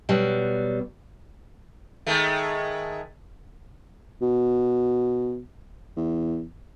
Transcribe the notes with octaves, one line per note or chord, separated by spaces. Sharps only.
B2 F#3 G3
D#3 G#3 A3
B2
E2